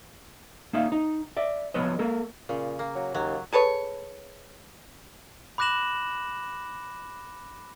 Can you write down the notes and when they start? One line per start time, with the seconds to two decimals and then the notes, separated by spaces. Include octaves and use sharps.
0.73 A#3 D#4 E5 F5
0.92 D#4
1.37 D5 E5
1.74 F3 B3 B4 C#5 D#5
1.99 A#3 A4 A#4
2.49 A#2 C#3
2.79 A#3
2.95 F#3
3.14 D#2 F#3
3.52 G#4 A4 B4 C#5
5.58 B5 D6 F#6 A#6 E7 F#7